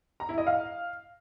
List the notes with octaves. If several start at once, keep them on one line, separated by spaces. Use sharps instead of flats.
A#5
E4
D#5
F5